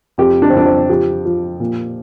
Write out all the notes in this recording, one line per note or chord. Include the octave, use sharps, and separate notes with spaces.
F2 G4
D4
C4
F2 D4
C4
F3 G4
F3
A#2